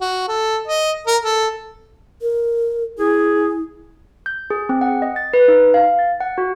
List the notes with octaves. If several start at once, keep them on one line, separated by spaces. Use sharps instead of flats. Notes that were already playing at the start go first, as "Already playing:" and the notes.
F#4
A4
D#5
A#4
A4
A#4
E4 G#4
G6
G#4
C4
F#5
D#5
A6
B4
D#4
F5
A6
F#5
F#4